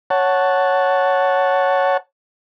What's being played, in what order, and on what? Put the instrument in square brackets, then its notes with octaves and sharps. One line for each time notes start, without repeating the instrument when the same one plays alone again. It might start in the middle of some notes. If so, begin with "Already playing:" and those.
[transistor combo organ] C#5 F#5 A5